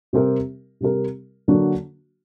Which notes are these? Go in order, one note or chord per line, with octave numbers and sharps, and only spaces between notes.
C3 G3 C4 G4 A#4
C3 G3 C4 G4 A#4
D3 F#3 A#3 D4 F#4